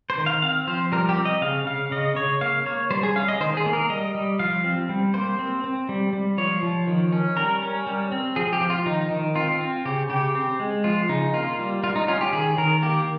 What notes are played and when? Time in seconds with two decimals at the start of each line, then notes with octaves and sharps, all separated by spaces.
0.10 C5
0.18 D#3
0.26 F5
0.42 C4 F5
0.67 F3 C5
0.92 G3 A#4
1.09 G4
1.17 C4
1.25 D#5
1.41 C#3 F5
1.67 C#3 F5
1.91 C#3 D#5
2.16 C#3 C#5
2.41 A#3 F5
2.66 A#3 C#5
2.91 G3 C5
3.03 G#4
3.16 C#4 F5
3.28 D#5
3.40 D#3 C5
3.57 G#4
3.66 A#3
3.73 A#4
3.89 G3 D#5
4.15 G3
4.39 F3 F5
4.64 C4
4.89 G3
5.14 A#3 C5
5.39 C4
5.64 C4
5.89 G3
6.13 G3
6.38 F3 C#5
6.63 F3
6.87 D#3
7.12 C#4
7.37 G3 A#4
7.62 C#4
7.87 G3
8.12 C4
8.36 F3 G#4
8.53 G4
8.61 F3
8.70 F4
8.86 D#3 D#4
9.10 D#3
9.35 C4 F4
9.61 C4
9.85 C#3 G4
10.10 C#3 G4
10.35 C4
10.60 G#3
10.84 F3 F4
11.09 C#3 D#4
11.34 A#3 F4
11.59 G3
11.83 G3 F4
11.96 D#4
12.08 C#4 F4
12.21 G4
12.33 D#3 G#4
12.58 D#3 A#4
12.82 A#3 G4